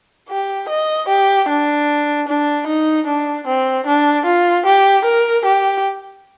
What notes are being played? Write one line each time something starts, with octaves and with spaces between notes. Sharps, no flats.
G4
D#5
G4
D4
D4
D#4
D4
C4
D4
F4
G4
A#4
G4